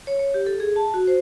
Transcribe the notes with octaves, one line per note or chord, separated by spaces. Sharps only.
C#5
C#5
G4
A4
G#4
A5
F#4
C5